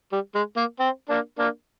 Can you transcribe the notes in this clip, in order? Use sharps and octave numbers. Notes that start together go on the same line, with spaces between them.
G3
G#3
A#3
C4
A#3 D4
A#3 D4